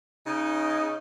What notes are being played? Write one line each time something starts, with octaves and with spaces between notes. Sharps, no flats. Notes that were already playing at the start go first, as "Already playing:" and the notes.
C#3 D#4